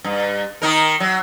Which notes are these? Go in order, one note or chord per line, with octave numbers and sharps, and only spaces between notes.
G2
D#3 D#4 A#4
F#3